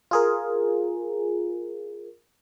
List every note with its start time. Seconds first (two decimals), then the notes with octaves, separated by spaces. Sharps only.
0.11 F4 G#4 A#4